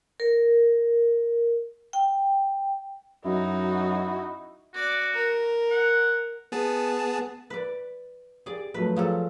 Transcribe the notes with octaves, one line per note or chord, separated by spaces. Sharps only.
A#4
G5
F#2 D#4 E4 F#4
F#4 D5 D6
A#4
F#5
B3 G#4 A5
B4 D5
G4 G#4 D5
F3 F#3 A3 B4
F3 F#3 G#4 A4 F5